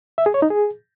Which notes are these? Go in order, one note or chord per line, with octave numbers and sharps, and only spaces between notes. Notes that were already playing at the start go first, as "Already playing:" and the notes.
E5
G#4
C#5
D#4
G#4